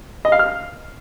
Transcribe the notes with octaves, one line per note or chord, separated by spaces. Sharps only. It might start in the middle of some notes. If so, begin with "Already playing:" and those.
D#5
F5
F6